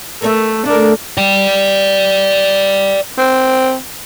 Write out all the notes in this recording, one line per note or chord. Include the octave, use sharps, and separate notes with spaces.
A3 A#4 C#5 E5
D2 A3 D4 A#4
D5 G5
C4